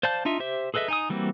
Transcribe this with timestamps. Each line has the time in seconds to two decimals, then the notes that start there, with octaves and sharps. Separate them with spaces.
0.03 C5 D5 F5 A5 G6
0.25 D4 D#4 F4 E5
0.40 G4 C5 E5
0.74 G#4 A4 B4 D#5 E5
0.88 D#4 G#5 D#6
1.10 E3 G3 A#3 C4 F#4